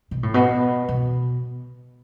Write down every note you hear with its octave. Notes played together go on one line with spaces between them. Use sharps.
B2
A2
B2
B2